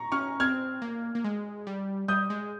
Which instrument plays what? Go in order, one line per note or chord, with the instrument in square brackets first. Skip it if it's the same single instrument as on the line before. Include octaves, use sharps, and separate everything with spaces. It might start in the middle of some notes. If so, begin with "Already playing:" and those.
Already playing: [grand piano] A#5 C#6
[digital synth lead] C#4 [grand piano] C#6 F6
[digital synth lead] C4 [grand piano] F6 G#6
[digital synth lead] A#3
A#3
G#3
G3
[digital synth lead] G3 [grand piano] D#6 G6
[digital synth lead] G#3